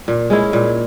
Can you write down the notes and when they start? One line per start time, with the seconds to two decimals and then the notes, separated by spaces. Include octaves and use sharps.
0.08 A#2
0.30 G#3 C#4 E4
0.53 A#2